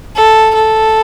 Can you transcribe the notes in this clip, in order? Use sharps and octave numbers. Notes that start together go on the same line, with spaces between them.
A4
A4